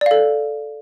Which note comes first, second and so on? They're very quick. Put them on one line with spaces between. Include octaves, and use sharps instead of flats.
D5 F5 A4